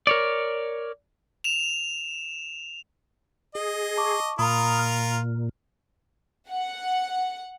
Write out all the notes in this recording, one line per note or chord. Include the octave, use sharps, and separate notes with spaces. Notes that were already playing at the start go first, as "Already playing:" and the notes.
A#4 C#5 D5
E7 F7
G#4 D#5
A5 C#6 D6
A#2 F4 A#4 A#5 B5 D#6
F6
F#5